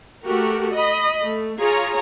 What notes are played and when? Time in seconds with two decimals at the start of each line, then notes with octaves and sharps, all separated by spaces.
0.24 A3 F#4 G4 A#4
0.71 D#5 B5
1.21 A3
1.59 F4 G#4 C#5 A#5